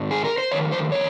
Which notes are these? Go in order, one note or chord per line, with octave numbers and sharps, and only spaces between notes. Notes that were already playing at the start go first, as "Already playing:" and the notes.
Already playing: G#2 D#3
G#4
A#4
C5
F2 D#3 C#5
C5
C#5